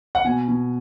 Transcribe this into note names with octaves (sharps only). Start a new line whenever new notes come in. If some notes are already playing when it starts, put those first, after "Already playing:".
F#5
B2 G#5
B2